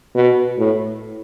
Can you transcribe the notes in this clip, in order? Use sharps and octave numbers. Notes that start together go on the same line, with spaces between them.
B2
A2